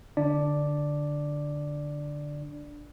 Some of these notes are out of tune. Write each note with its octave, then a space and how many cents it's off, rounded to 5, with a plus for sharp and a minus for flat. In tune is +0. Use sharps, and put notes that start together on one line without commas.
D3 +0 D4 +0 D5 +0